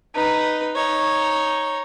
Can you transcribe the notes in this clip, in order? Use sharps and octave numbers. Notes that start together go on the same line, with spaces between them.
D#4 B4
D#4 C#5